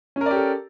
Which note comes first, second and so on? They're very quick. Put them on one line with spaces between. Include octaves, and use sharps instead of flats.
C#4 A#4 D5 G4 A4